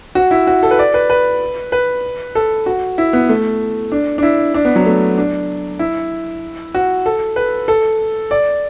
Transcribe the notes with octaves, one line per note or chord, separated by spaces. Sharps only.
F#4
E4
F#4
A4
B4
D5
B4
B4
B4
A4
F#4
E4
B3
A3
D4
D4
E4
D4
B3
F#3
A3
D4
E4
F#4
A4
B4
A4
D5